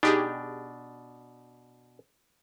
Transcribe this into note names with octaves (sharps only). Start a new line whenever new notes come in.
B2 D4 D#4 G4 G#4